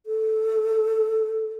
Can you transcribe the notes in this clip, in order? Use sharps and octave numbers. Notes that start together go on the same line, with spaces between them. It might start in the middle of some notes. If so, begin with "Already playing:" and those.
A4